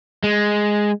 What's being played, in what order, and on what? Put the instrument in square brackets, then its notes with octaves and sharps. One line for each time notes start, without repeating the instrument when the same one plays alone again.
[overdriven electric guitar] G#3